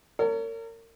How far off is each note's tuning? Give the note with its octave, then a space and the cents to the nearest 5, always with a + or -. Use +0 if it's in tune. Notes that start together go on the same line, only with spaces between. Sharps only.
A#4 -35 C#5 +30